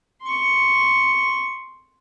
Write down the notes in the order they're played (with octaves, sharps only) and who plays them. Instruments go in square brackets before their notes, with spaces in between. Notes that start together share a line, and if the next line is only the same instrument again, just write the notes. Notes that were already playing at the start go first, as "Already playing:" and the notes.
[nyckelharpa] C6 C#6